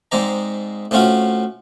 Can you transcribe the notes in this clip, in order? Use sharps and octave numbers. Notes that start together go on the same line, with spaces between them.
G#2 G#3 C4 D5 A#5
A2 C4 C#4 F4 F#4 F5